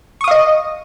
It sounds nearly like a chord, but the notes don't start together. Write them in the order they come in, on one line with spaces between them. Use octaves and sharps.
C#6 D#6 F5 D#5